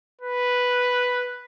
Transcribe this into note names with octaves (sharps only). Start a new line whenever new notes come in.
B4